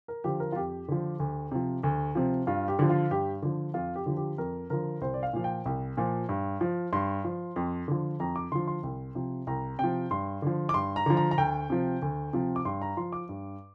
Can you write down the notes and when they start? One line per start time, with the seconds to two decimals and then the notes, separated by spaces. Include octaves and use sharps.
0.08 A#4
0.24 D3 F3 G4
0.40 A#4
0.52 F4
0.56 F2 G4
0.88 D3 F3
1.20 D2
1.52 C3 F3
1.83 D2
2.15 C3 F3
2.47 G2 F4
2.68 G4
2.79 D3 F3
2.90 F4
3.11 G2 G4
3.42 D3 F3
3.74 F2 F4
3.95 G4
4.06 D3 F3
4.17 G4
4.38 F2 A#4
4.70 D3 F3 A#4
5.01 C2 C5
5.14 D5
5.23 F5
5.33 A#2 F3
5.44 G5
5.66 C2
5.97 A#2 F3
6.29 G2
6.61 F3
6.93 G2 C6
7.24 F3
7.56 F2
7.88 D3 F3
8.20 F2 A#5
8.36 D6
8.52 D3 F3 C6
8.67 C6
8.83 C2
9.15 C3 F3
9.47 C2 A#5
9.79 C3 F3 G5
10.11 G2 C6
10.42 D3 F3
10.69 D6
10.74 G2 C6
10.96 A#5
11.06 D3 F3
11.17 A#5
11.31 A#5
11.38 D2 G5
11.70 C3 F3
12.02 D2
12.33 C3 F3
12.56 D6
12.65 G2 C6
12.82 A#5
12.97 F3 C6
13.13 D6
13.29 G2